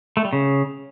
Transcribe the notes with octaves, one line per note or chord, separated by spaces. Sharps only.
A3
G3
C#3